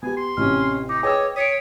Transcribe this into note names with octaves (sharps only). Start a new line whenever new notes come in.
B3 G4 G#5
C6
A1 C3 C#4 F6
D#4 D6
G#4 B4 C#5 D#5 G5 D6 E6
C#5 D#6 B6 C#7 D7